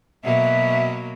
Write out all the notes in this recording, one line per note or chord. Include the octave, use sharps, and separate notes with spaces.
B2 F#3 A#3 E5